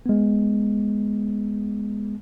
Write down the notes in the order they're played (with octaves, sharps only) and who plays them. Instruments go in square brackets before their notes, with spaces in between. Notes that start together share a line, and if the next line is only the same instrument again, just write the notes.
[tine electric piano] G#3 B3